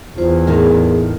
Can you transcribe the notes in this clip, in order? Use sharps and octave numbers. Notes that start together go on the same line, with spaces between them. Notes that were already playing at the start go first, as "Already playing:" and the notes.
E2 F4 C5
A2 D#3 A#3 B3 G#4 A#4